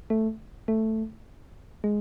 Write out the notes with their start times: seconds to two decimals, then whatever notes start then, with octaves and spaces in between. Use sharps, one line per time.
0.10 A3
0.68 A3
1.84 G#3